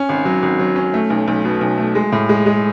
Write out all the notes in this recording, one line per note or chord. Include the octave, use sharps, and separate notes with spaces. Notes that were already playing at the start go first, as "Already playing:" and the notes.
Already playing: C#4
G#1
F#3
G#1
F#3
C#4
A3
B1
B1
B2
B1
A3
G#3
A2
G#3
G#3